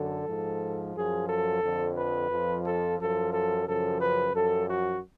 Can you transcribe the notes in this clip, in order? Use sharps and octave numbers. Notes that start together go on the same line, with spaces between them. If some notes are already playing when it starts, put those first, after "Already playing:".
Already playing: F#2 D3 A4
G#2 F3
F#2 F3 G#4
A4
F2 D3 F3
B4
F2 F3
A4
F#2 F3 A4
A4
F#2 C#3 F3 A4
B4
F#2 F3 A4
F#4